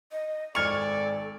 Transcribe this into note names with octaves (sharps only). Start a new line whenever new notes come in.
D#5
G#1 A4 D5 G#5 C#6 F6 F7